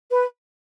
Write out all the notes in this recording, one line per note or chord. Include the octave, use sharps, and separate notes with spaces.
B4